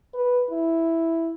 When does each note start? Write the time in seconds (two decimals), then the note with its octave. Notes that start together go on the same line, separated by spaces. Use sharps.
0.14 B4
0.51 E4